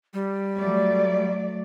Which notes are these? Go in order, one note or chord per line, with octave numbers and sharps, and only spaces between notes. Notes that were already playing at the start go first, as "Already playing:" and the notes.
G3
F#3 A3 D5